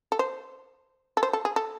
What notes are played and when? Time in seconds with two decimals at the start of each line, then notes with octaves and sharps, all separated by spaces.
0.12 A4
0.19 C5
1.17 A4
1.23 C5
1.33 A4
1.45 G#4
1.56 A4